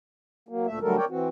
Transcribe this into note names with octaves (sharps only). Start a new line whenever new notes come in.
F#3 A#3
D2 A#2 A3 E5
D3 F#3 G3 A3 A4 A#4
A#4 C#5 D5 G5
E3 C4 F#4